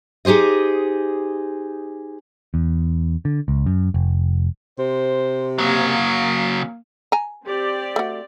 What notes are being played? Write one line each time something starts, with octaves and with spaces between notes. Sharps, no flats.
D#4 G4 G#4 C5 D#5
E2
D3
C#2
F#2
F1
C3 C5
C#3 F#3 A#3
G#5 A#5
C4 G4 D5
A3 F#4